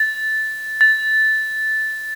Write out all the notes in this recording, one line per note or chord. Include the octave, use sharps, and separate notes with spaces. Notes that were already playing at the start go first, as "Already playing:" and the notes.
Already playing: A6
A6